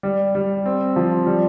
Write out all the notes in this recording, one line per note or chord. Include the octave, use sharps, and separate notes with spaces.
G3
G3
C4
F3
G3